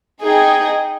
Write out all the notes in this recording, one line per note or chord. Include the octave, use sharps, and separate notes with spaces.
D#4 G#4 D#5 G5